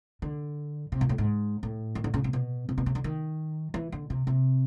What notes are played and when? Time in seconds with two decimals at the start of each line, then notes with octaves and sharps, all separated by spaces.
0.22 D3
0.92 C3
1.01 A#2
1.09 A2
1.18 G#2
1.63 A2
1.95 D#3
2.04 D3
2.14 C#3
2.24 C3
2.33 B2
2.69 C3
2.78 B2
2.86 C3
2.95 D3
3.04 D#3
3.74 E3
3.92 D3
4.10 C3
4.27 C3